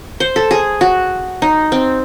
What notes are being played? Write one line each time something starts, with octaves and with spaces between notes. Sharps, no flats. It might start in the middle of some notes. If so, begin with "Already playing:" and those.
C5
A4
G#4
F#4
D#4
C4